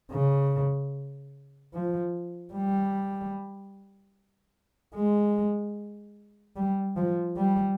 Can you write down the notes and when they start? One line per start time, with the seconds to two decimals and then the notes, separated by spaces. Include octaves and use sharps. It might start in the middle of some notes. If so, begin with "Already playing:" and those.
0.11 C#3
1.73 F3
2.54 G3
4.94 G#3
6.56 G3
6.97 F3
7.37 G3